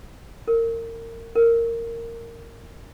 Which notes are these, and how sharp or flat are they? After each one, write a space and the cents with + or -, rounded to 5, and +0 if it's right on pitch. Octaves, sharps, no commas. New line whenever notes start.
A#4 -30
A#4 -15